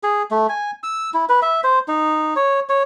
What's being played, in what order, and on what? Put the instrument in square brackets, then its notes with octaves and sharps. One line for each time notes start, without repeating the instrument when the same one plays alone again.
[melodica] G#4
A3
G#5
E6
E4
B4
E5
C5
D#4
C#5
C#5